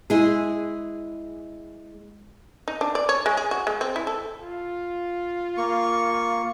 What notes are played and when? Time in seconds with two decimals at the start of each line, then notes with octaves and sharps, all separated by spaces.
0.10 G#3 E4 G#4
2.68 D#4
2.81 D4
2.95 D5
3.09 C#5
3.26 G#3
3.37 G#4
3.51 F#4
3.67 G#3
3.81 C4
3.96 E4
4.07 A4
4.42 F4
5.57 A#3 C#6